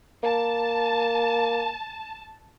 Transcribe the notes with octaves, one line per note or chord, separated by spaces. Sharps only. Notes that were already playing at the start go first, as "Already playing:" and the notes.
A#3 A5